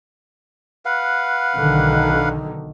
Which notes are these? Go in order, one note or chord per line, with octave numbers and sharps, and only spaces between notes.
B4 F5 F#5
B1 D3 D#3